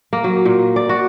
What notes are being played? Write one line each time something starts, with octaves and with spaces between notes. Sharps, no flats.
A#3
F#3
A#2
D5
F#4